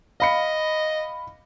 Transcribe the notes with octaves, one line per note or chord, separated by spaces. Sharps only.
D#5 F5 B5 C#7